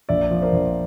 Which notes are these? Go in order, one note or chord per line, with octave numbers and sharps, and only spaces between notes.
A#1 D5 E5
F3
A#4 C5
A#1